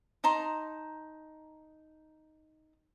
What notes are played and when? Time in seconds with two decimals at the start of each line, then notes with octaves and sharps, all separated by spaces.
0.24 D#4 A5 A#5 C6